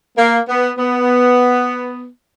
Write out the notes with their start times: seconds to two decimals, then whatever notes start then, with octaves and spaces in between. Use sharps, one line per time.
0.18 A#3
0.49 B3
0.78 B3